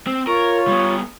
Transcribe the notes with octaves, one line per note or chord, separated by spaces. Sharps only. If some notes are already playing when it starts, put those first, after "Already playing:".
C4
F4 A#4 C#5
G3 B3